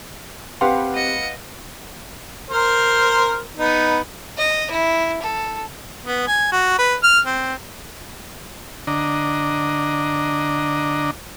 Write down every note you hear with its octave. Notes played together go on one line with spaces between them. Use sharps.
C4 G4 B4 F5 F#5 C6
D#5 C#7
A#4 C5 F6
B3 D#4
D#5
E4
A4
B3
G#5
F#4
B4
F6
C4
D3 D4 D#5 A#5